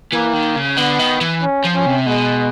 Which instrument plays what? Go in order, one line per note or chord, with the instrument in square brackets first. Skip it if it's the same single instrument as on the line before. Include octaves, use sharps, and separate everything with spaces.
[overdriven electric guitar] E3 [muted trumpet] A#3
[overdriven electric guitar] D#3
C#3
[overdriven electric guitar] D3 [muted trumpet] B3
[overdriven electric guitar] D#3
E3
[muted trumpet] C#4
[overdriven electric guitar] F3
[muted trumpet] C#4
[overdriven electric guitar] C3
[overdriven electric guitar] B2 [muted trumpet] G#3